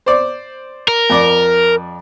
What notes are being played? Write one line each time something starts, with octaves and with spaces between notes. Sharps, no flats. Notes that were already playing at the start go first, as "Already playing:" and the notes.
C5 D5
A#4
F2 D5